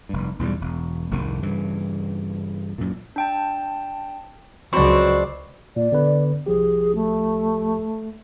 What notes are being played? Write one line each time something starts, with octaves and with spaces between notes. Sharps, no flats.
F1 G2
B1 E2 G#2 G3
E1
F1 C2 G#2 D#3
G2 C#3 E3
F#2 A#2
D4 G5 A5
C#2 F#3 C4 D4 F#4 B5 C#6
A#2 D5
D3 B3 B4
C2 F3 G4 G#4
A3